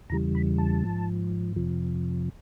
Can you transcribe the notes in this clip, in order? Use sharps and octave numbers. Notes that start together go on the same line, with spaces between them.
E2 C#3 E3 G3 A#5
B5
A5
G#2 F3
F2 C3 F3